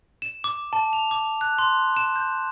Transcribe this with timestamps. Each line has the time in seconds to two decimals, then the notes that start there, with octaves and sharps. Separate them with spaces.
0.22 E7
0.44 D6
0.73 A5
0.93 F7
1.11 D6
1.41 F#6
1.59 C6
1.97 E7
2.16 G6